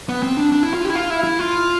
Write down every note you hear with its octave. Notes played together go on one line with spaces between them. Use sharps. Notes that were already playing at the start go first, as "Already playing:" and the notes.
B3
C4
D4
D4
E4
F4
G4
E4
F4
E4
E4
F4